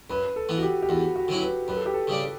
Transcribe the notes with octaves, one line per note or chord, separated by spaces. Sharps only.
F#2 B4
A4
E3 B3
F#4
G4
G4
E2 F#4
F#4
D3 F#3 C#4 E4
B4
F#2 B4
A4
G4
A4
C#3 G3 D4